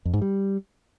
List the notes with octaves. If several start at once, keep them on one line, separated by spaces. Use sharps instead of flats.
F2
G#2
G3